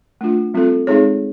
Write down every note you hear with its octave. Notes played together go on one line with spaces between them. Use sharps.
A3 D4 F4
G3 C4 F4 A4
G#3 C4 D#4 G#4 C#5